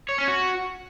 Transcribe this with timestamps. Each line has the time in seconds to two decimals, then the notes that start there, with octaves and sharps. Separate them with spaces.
0.09 C#5
0.18 C#4
0.28 F#4